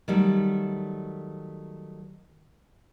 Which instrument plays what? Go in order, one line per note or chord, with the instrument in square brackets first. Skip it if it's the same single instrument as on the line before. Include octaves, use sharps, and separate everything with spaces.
[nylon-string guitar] D#3 F#3 G3 A3